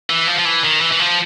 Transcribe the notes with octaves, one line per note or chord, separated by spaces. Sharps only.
E3
F3
F3
E3
D#3
E3
E3
F3